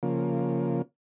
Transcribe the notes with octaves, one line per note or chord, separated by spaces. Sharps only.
C#3 F3 A#3